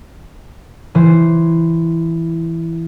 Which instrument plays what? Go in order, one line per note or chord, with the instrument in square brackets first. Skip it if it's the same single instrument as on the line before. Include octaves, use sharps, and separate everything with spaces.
[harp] E3 C5